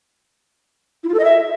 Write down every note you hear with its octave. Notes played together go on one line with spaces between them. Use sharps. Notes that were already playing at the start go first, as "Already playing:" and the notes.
E4
F4
A4
D#5
E5